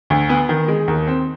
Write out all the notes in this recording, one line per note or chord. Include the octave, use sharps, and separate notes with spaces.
D2
B3
D#3
G#3
D#2
C4